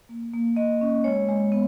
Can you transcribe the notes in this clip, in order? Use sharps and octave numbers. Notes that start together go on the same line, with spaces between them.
A#3
A#3
A#3 D#5
C#4
G#3 C#5
G#3
B3